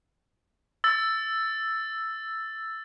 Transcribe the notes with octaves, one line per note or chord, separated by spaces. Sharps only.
E6 A6